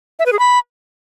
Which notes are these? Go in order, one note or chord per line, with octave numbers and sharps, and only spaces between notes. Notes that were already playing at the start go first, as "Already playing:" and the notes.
E5
B4
G#4
B5